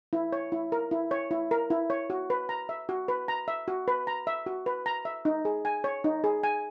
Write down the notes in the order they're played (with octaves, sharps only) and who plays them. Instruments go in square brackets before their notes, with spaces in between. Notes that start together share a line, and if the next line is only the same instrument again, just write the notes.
[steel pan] E4
C#5
E4
A#4
E4
C#5
E4
A#4
E4
C#5
F#4
B4
A#5
E5
F#4
B4
A#5
E5
F#4
B4
A#5
E5
F#4
B4
A#5
E5
D#4
G#4
G#5
C#5
D#4
G#4
G#5